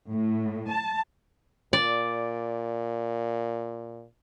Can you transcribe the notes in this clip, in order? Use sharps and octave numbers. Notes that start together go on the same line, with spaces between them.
A2
A5
A#2 D5